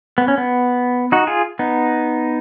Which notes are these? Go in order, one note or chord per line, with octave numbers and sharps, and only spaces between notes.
B3
C#4
B3
D#4 F#4
F4 G#4
B3 D#4